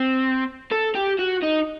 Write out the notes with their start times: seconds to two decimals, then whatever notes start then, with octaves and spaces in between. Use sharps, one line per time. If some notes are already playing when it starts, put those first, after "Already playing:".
Already playing: C4
0.71 A4
0.95 G4
1.19 F#4
1.42 D#4